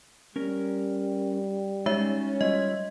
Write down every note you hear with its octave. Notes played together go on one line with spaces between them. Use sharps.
G3 C#4 A#4
G#3 C#4 D#4 F#4 E5
G3 F4 D#5 E5